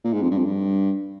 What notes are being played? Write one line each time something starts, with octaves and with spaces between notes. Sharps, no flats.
A#2
G#2
F2
G2
F2
G2